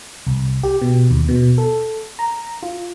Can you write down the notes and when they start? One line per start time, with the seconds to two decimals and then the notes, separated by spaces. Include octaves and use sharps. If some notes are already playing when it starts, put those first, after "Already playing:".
0.27 C2
0.63 G4
0.82 B2
1.10 D#2
1.28 B2
1.58 A4
2.19 A#5
2.63 F4